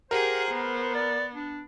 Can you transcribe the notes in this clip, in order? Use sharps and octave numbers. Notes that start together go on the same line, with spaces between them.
G4 G#4 A#4 C5 F#5
B3
D5
D4